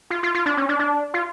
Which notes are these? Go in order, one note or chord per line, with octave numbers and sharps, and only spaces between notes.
F4
F4
F4
D4
C#4
D4
D4
F4